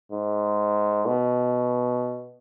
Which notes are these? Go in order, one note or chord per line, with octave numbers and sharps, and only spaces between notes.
G#2
B2